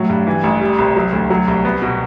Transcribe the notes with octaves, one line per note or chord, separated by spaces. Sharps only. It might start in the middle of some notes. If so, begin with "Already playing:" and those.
Already playing: A2 F#3
G2
E3
A1
G3
C2
F#3
D2
F#3
C2
B3
B2